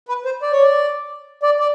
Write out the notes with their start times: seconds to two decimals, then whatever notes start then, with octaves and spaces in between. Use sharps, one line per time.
0.08 B4
0.25 C5
0.42 D5
0.52 C#5
0.62 D5
1.43 D5
1.60 D5